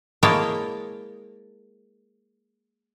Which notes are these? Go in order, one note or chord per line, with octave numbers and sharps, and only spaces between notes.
G#3 A#3 E4 C#5 G5 A5